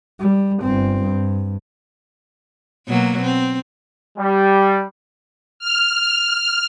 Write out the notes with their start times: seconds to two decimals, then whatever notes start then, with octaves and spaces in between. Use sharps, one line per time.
0.19 G3
0.61 G1 C4
1.04 G2
2.88 B2 F#3 A#3
3.22 C4
4.18 G3
5.59 F6